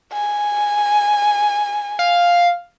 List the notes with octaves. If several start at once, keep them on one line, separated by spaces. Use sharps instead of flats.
G#5
F5